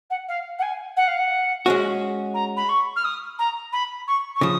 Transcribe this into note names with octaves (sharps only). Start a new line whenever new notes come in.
F#5
F5
F#5
G#5
F#5
F5
F#5
G#3 C#4 F#4
A#5
B5
C#6
F6
D#6
A#5
B5
C#6
C#6
C#3 F3 D#6